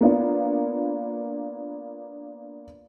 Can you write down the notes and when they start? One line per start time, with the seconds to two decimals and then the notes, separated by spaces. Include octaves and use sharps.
0.01 A#3 B3 D4 F4